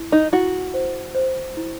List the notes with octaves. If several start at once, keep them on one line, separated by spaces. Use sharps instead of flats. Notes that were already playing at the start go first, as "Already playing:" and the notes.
Already playing: E4
D#4
E4 F#4
C5
C5
E4